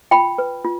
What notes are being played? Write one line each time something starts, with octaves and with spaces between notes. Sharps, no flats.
F4 G5 B5
B4
F4